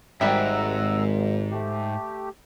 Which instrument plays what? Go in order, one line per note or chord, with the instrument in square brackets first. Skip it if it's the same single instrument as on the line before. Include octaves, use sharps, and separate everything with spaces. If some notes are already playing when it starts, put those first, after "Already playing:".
[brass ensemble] G#1 [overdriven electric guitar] G#2 [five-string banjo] G3 E5 G5 [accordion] F#5 A#5 E6
[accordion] A3 G4